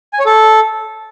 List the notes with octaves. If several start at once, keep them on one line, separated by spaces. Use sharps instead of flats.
G#5
C#5
A4